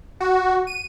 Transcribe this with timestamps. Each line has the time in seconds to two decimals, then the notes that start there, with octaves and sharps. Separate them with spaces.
0.20 F#4
0.67 D#7